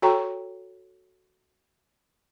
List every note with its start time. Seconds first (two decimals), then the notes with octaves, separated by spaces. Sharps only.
0.02 F#4 A4 C#5 G5 A#5 C#6